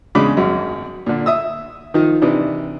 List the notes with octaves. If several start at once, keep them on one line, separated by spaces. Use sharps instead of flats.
E2 C#3 G#3 D4 B5 D6
G#1 F#2
A#2 D3
E5 D#6 E6
D#3 F3 D#4
C3 E3 D4 D#4